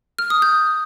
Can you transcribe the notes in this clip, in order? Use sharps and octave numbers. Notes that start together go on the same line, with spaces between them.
F6
D#6
G6